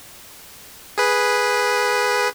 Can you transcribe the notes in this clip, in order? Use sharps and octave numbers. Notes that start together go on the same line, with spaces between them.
G#4 B4